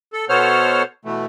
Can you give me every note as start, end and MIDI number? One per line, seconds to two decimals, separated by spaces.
0.13 0.25 69
0.29 0.83 47
0.29 0.83 59
0.29 0.83 69
0.29 0.83 72
0.29 0.83 73
0.29 0.83 89
1.05 1.26 47
1.05 1.26 52
1.05 1.26 57